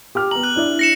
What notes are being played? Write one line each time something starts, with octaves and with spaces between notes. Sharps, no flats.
G4 D6 F6
B3 A#5 F#7
F#6 F#7
D4 E4 D5
A#6 C#7 E7